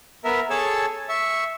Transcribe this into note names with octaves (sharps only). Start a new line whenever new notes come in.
B3 A#4 E5
G#4 A4 C#5 A5 E6
E5 C#6 E6